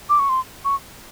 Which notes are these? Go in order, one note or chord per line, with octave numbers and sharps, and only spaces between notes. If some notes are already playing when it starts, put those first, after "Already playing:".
D6
C#6
C6
C#6